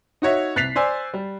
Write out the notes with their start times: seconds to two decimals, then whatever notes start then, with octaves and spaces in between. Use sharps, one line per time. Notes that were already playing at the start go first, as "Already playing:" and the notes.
0.22 D#4 F#4 C#5 E5
0.56 C2 F#6 A6 B6 C7 F7
0.75 C5 D5 G#5 E6
1.14 G3